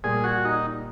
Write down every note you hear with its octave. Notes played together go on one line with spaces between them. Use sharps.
A#2 G3 A#3 G#4
F#4
D#4